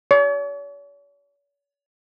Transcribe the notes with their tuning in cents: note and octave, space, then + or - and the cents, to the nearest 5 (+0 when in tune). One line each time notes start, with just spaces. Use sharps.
C#5 +45